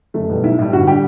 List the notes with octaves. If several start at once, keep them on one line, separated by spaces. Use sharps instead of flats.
F#1 A3
E2 B2 G3
B1 E4
A2 G3
G1 F#4
D3 G3 G4